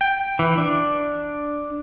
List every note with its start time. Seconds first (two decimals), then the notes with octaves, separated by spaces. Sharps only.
0.01 G5
0.39 E3
0.58 D4